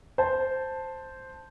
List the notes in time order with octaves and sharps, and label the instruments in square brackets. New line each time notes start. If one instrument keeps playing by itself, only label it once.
[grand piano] C5 A5